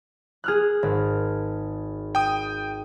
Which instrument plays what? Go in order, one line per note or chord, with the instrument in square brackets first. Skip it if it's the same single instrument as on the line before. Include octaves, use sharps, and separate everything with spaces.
[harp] G#4 F6 F#6
G#1
[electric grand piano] G5 D#6